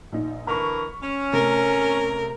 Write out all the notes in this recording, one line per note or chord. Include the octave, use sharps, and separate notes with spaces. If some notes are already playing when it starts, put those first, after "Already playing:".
A#1 D#4
D3 E3 A#4 B5 C#6
C#4
C3 A3 A#4